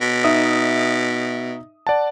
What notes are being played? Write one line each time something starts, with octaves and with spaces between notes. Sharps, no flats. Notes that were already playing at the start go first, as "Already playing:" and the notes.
B2
D#4 E5 D#6
D5 F#5 A5